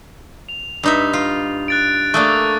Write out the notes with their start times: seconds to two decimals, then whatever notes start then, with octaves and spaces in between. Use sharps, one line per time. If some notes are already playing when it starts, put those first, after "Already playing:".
0.49 F7
0.83 G2 D#4 E5
1.13 F4
1.68 F#6 A6 D7
2.14 A3 A#3 D4 C#6 D#6 A6